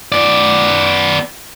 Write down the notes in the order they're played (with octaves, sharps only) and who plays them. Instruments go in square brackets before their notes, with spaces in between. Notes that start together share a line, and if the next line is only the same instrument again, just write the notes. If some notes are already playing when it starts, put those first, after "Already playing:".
[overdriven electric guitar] B3 D5